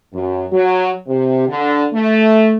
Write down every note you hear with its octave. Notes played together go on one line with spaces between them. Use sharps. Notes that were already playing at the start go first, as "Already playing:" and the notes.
F#2
F#3
C3
D3
A3